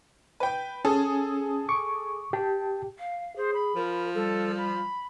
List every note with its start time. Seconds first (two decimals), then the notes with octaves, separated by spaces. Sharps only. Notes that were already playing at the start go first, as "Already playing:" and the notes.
0.40 B4 G5
0.85 C#4 G#4 A4
1.69 C#6 D6
2.33 G4 G5 A5
2.99 F5
3.36 G#4 C5
3.54 B5
3.76 F3 A#4
4.14 G3 A4
4.57 B5